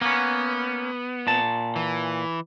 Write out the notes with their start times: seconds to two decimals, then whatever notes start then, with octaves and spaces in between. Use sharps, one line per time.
0.01 A#3 B3 C#4
1.27 A#2 A5
1.76 E3